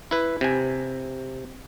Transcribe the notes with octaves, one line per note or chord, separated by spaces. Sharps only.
E4 B4
C3 G#5